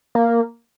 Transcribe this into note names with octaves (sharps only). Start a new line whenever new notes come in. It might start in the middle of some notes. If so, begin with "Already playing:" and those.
A#3